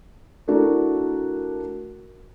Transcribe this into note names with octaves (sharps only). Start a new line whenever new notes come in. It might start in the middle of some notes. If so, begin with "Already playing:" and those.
A3 D4 E4 F#4 A4 A#4